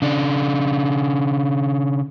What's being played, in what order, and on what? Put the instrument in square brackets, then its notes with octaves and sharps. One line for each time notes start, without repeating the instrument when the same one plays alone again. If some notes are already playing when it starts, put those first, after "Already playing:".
[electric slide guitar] C#3 D4